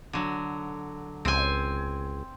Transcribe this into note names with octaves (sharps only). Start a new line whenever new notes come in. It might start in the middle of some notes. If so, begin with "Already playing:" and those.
D3 F#3
C#2 C4 G#5